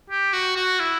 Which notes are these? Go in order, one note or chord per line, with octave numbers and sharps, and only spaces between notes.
G4
F#4
F#4
E4